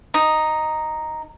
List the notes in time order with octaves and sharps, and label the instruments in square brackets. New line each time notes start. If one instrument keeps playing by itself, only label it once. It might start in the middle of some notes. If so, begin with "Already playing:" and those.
[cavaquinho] D#4